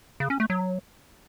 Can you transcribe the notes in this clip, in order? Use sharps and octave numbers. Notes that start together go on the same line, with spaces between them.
C#3
C#4
A3
F#3